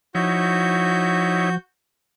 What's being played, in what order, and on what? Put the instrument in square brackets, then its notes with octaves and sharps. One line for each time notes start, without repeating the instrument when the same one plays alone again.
[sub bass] F3 [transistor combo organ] D#4 E4 C#5 [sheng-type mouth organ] F#4 G6